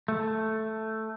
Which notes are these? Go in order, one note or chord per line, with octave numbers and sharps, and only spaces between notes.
A3